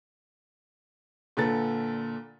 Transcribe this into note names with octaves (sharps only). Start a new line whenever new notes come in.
A#2 D3 A4 B4 A#5 A6